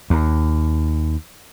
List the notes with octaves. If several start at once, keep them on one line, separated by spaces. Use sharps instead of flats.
D#2